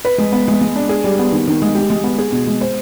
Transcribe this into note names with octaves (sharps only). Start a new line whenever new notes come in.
B4
G#3
B3
G#3
G#3
D4
G#4
G3
B3
D#3
D#3
G#3
G4
G#3
B3
G#4
B2
G#3
C5